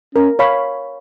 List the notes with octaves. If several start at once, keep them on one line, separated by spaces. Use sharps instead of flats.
C#4 A#4
C#5 F5 B5